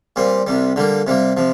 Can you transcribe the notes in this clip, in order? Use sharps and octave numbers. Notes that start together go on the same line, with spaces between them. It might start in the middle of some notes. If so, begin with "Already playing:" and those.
A#2 G3 C4
C2 C3 G3
D3 G3 A#3
C3 G3 A#3
C3 F3